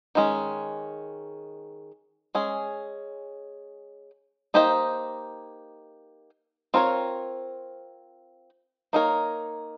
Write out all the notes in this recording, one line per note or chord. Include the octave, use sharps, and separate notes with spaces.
D#3 G#3 C#4
G#3 C#4 G#4
A#3 D#4 G4 C5 D#5
C4 F4 A#4 C#5
A#3 D#4 A#4 C#5